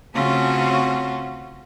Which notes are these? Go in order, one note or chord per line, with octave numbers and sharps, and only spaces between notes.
C#3 A3 C4 C#4 F4 F#4